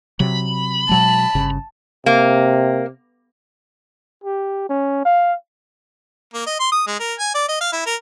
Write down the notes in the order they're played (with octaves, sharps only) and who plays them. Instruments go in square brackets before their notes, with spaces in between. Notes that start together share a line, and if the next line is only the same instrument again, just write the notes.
[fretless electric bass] C3 F#3 [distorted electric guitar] B5
[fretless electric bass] B2 F#3 G#3 [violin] A5
[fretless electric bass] G1 C#3
[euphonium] C3 [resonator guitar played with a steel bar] A#3
[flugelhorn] G4
C#4
F5
[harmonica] A#3
D#5
C6
D#6
G#3
A#4
G#5
D5
D#5
F5
E4
A#4